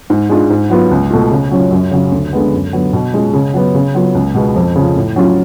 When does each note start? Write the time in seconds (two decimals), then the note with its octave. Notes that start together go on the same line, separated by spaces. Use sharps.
0.10 G#2
0.30 G#3 D4 F4
0.50 G#2
0.70 F#3 B3 F4
0.91 C#2
1.10 B2 A3 F4
1.31 C#3
1.51 F#3 C#4 F4
1.71 F#2
1.91 C#3 F#3
2.12 D2
2.33 D3 G#3 B3
2.53 F#2
2.73 D3 F#3 B3
2.93 B2
3.14 G#3 C#4 F4
3.33 C#3
3.54 F#3 B3
3.74 C#3
3.95 F#3 B3 F4
4.15 C#2
4.35 B2 G#3 B3
4.56 F2
4.76 C#3 F3
4.96 A2
5.16 F#3 C#4 F4